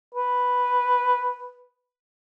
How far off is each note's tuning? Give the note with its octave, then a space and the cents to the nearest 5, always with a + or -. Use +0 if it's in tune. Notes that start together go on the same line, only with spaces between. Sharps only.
B4 +0